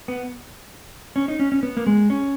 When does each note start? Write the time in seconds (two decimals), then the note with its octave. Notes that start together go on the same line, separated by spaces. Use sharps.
0.08 B3
1.16 C#4
1.28 D#4
1.40 C#4
1.52 C#4
1.63 B3
1.77 A#3
1.87 G#3
2.10 C#4